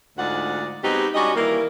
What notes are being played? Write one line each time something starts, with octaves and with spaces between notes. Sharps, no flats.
D2 G#2 F4 D5 F#5
B2 G#3 C4 D#4 F#4 G4
G3 C#4 D4 F#4 G4 D#5
D#3 E3 G3 A#3